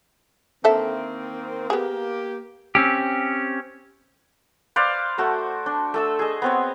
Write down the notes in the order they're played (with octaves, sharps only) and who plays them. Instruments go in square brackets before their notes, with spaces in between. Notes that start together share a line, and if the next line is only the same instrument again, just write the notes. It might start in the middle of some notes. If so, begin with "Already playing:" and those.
[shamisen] D3 A4 E5 [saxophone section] D#3 A#3 C4
[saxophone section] A#3 G4 [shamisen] B3 G#4
[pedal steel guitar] C4 C#4 G4
[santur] B4 C5 D5 F5
A3 F#4 C5
D4
A3 A4 E6
G#4 D#5
B3 C4 C#5